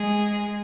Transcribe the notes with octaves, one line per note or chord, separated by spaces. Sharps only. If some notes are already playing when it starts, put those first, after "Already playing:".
Already playing: G#3 G#4